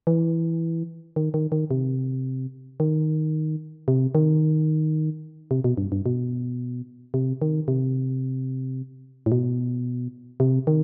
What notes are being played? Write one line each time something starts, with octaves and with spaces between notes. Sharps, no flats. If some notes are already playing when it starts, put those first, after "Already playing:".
E3
D#3
D#3
D#3
C3
D#3
C3
D#3
C3
B2
G2
G2
B2
C3
D#3
C3
A2
B2
C3
D#3